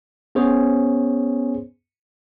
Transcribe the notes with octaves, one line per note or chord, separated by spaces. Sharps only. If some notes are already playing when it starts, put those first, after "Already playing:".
B3 C#4 G#4 C5 C#5